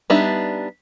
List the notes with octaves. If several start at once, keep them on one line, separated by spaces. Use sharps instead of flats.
G3 B3 D4 D#4 E5